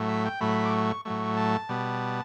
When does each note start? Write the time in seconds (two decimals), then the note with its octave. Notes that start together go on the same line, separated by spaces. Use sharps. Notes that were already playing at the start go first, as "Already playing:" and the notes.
Already playing: A2 F#3 A3
0.09 E5
0.25 G5
0.40 A2 F#3 A3 B5
0.65 D6
0.73 C#6
1.05 A2 F#3 A3 C#6
1.37 A5
1.69 B2 G3 B3